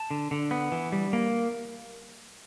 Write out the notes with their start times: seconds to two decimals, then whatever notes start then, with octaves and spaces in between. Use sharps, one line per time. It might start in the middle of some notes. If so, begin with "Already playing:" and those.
Already playing: A5
0.11 D3
0.31 D3
0.51 B3
0.72 E3
0.92 G3
1.13 A#3